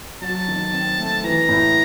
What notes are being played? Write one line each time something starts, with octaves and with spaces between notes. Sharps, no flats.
F#3 A5
D#3
C4
A3
E3 A#5
A2